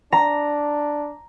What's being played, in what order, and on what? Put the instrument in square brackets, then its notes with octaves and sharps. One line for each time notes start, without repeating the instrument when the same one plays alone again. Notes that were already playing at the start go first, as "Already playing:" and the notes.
[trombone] D4 [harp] A#5